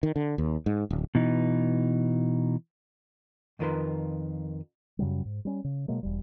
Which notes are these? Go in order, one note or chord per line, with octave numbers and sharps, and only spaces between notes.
D#3
D3
D#2
G#2
D1
B2 E3 D#4
F2 D#3 F4 A#4 B4 C6
F#2 C#3 F#3 G3
G#2
G3 C#4
C#3
B2 F#3 G#3 A#3
E1 G3